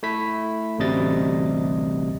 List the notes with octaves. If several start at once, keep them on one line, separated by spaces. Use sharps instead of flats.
A3 E4 B6
A1 D2 C3 G3 D#5 A6